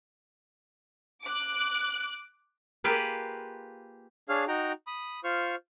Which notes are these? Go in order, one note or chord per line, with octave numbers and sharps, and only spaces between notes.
D6 F#6
A#3 F4 G4 G#4 B4
D4 G#4 C#5 F5 F6
D#4 F#4 G5 A#5
B5 D#6
F4 C5 C#6 F6